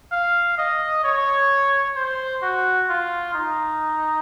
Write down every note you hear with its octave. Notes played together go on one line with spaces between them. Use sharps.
F5
D#5
C#5
C5
F#4
F4
D#4